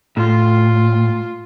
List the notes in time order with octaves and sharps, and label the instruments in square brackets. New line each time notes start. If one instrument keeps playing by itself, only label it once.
[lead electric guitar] A2 [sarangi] F4